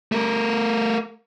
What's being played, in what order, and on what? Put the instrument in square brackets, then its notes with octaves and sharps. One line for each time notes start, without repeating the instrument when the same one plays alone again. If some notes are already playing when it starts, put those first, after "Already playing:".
[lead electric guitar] A3 A#4